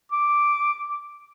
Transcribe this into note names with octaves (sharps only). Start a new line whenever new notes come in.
D6